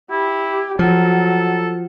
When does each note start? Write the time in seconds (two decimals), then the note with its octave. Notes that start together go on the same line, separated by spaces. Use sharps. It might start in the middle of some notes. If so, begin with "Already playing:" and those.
0.11 E4 G4
0.79 F3 F#3 A4